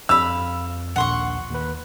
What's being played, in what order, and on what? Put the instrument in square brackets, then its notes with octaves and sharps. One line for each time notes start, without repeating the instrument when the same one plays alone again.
[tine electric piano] F2 [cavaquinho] F5 B5 [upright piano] E6
[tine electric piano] A#1 D#2 [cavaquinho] F#5 C6 C#6
[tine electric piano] D#2 B4